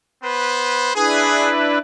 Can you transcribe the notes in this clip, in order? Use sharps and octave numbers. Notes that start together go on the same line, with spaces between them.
B3 B4 C5
D4 E4 G#4 B4